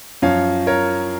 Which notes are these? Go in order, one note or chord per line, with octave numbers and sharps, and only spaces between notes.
F#2 F3 C#5 F5
A#4 C#5